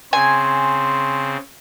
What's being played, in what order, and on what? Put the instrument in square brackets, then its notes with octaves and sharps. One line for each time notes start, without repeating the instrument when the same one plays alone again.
[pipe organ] C#3 C4 [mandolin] G#5 [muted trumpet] C6